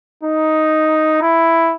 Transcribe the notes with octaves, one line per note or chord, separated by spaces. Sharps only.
D#4
E4